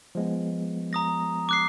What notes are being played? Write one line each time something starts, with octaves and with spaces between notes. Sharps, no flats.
F3 G#3 B3
A#5 D#6 A#6
D6 F#6 C7